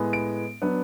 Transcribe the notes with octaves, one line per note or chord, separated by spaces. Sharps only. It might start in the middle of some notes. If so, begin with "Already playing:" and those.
Already playing: A2 G#3 B3
D7
F#3 B3 D4